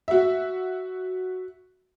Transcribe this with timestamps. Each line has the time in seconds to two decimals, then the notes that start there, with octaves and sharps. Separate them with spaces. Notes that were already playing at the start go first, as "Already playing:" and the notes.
0.08 F#4 E5